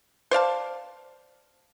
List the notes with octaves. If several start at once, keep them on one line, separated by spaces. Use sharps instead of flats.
C5 D5 F5 A5